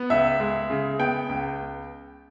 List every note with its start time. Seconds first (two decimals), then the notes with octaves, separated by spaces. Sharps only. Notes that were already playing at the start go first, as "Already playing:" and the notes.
Already playing: B3
0.10 C#2 E5
0.40 G#3
0.70 C#3
0.99 B3 G5
1.29 C#2